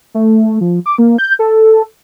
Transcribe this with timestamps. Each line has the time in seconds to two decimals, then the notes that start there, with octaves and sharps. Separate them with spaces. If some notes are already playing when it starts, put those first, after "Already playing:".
0.14 A3
0.61 F3
0.86 D6
0.98 A#3
1.18 G6
1.39 A4